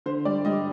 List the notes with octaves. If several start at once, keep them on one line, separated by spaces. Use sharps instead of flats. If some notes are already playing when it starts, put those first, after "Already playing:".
D3 C5
G3 D5
G3 D#5